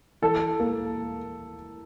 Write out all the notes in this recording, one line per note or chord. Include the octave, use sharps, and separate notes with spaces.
E3 A4
A#3